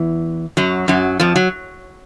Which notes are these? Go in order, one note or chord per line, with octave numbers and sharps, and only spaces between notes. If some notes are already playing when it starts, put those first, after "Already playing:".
Already playing: E2 E3
F#2 F#3
F#2 F#3
F2 F3
F#3